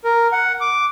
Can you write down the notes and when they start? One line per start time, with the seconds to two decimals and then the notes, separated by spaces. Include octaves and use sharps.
0.04 A#4
0.32 F#5
0.61 D6